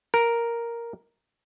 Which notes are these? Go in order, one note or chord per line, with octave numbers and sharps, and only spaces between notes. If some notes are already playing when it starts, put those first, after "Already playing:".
A#4